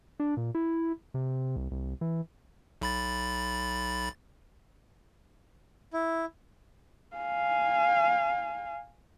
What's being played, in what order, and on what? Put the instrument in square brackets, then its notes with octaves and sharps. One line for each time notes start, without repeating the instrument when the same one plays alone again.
[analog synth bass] D4
A#2
E4
C3
C2
C2
E3
[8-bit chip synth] B1 B5 A6
[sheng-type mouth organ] E4
[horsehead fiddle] F5 G#5